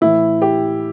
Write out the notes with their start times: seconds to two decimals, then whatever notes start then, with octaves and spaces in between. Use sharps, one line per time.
0.01 A2 E3 E4
0.42 G4